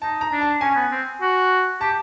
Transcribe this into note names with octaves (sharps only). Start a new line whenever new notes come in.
D#4 A5
A#5
D4
A5
C#4 G#5
B3
C4
F#4
G4 A5